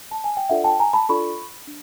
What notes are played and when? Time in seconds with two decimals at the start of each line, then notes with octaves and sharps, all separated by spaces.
0.11 A5
0.24 G#5
0.37 G5
0.49 D4 F4 A4 D5 E5 F#5
0.64 G5 A5
0.80 G#5 A#5
0.93 A5 B5
1.09 D4 F4 A4 D5 B5 C#6
1.67 D4